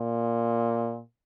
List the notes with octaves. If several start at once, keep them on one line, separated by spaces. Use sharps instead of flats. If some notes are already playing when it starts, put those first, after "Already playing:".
Already playing: A#2